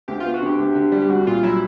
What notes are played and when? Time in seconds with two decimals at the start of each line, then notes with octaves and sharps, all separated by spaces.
0.08 D2 G4
0.20 B3 F4
0.34 F#4
0.42 D3 G4
0.59 D2
0.75 D3
0.92 G3
1.02 G4
1.09 C2 F#4
1.27 A#2 F4
1.43 F#3 E4